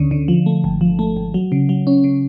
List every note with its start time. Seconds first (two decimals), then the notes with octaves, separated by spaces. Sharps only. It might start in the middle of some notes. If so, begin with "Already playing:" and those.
Already playing: D2 D3 C#4
0.11 D3
0.28 F3
0.46 A3
0.64 G#1
0.81 F3
0.99 A3
1.17 G#1
1.34 F#3
1.52 C#3
1.69 F#3
1.87 C#4
2.04 C#3